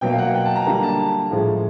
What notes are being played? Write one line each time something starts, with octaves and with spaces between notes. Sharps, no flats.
B2 F#3 A#3 G5
F5
F#5
G5
A5
A#5
D3 G3 A#3 A#5
A5
A2 F3 G#3